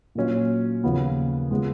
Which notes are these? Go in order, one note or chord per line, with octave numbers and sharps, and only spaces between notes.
A#2 F#3 C#4 F4
D#2 C#3 F3 B3
C#3 G#3 B3